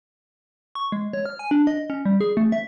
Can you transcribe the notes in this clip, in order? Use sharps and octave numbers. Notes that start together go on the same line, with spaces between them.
C#6
G#3
C#5
F6
G#5
D4
D#5
C#4
G3
G#4
A3
E5